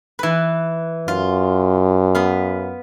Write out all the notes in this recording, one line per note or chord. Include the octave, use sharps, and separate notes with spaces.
E3 B4
F#2 F4
B3 F5